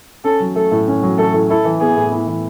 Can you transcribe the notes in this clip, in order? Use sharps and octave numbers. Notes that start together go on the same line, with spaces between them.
C#4 A4
F#3
A3 A4
A2
C#4
F#3
A3 A4
A2
E4 A4
E3
B3 G#4
A2
E4
E3